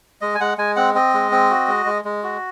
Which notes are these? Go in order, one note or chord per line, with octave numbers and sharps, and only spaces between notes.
G#3 D#5
G#5
G#3 F#5
G#3 G#5
C4 F#5
C4 D#5
G#3
C4
F#4
G#3
G#3
G#3
F#4